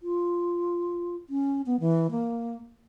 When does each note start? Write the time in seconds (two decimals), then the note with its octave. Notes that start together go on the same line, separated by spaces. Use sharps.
0.03 F4
1.30 C#4
1.66 B3
1.80 E3
2.11 A#3